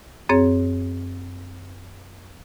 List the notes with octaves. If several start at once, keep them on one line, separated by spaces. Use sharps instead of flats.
F#2 C4 G#4 C#5